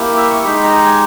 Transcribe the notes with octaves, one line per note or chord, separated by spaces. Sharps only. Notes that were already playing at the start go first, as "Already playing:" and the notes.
Already playing: A#3 E4 G4
E5
C#6
G#3 D#4 G4 B5
A#5
G#5